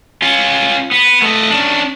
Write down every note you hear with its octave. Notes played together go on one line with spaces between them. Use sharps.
C#4 F4
B3
A3 D#5
C#4 D4